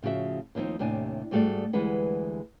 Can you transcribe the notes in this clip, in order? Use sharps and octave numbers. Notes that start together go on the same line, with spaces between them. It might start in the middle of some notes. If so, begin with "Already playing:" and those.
A2 C#3 F3 F#4 E5
D#2 F3 A#3 C4 D#4
D#2 A2 C3 D4 G#5
G#2 G3 A3 F#4 G#4 D5
D2 E3 G3 G#3 B4 F#5